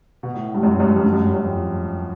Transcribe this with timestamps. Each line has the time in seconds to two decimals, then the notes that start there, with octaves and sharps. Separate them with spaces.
0.23 B2
0.34 A2
0.54 G2
0.63 F#2
0.72 G2
0.80 F#2
0.88 G2
0.97 F#2
1.05 G2
1.13 F#2
1.25 G2
1.34 F#2
1.44 F2